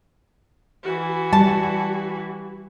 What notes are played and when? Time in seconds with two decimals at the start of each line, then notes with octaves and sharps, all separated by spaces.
0.83 E3 F#4
1.33 G3 A5